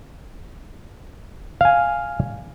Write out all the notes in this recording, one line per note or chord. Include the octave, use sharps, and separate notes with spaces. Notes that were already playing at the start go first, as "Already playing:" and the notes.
F5 G#5